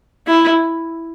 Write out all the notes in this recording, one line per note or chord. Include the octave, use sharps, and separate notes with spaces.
E4